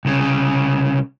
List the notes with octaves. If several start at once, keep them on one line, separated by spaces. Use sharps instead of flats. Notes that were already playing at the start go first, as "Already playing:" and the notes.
C2 C#3